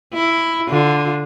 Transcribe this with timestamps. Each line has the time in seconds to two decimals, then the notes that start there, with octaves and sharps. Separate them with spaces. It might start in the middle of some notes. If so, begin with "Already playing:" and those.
0.13 E4
0.70 D3 F4